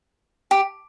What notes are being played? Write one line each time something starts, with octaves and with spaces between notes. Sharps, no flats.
G4